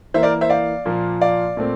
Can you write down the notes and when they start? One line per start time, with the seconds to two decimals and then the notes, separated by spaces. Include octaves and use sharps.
0.14 E3 A#3 C5 E5
0.23 A#4 D5
0.41 C5 E5
0.50 D5 F5
0.85 A#2 F3 A#3
1.21 D5 F5
1.57 A#2 A3 C4